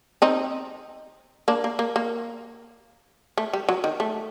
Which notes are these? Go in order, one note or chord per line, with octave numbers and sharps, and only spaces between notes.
C4 D#4
A#3 D4
A#3
A#3
A#3
A3
G3
F#3
D#3
A3